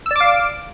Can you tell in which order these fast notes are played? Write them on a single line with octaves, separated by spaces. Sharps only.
E6 D5 D6 F5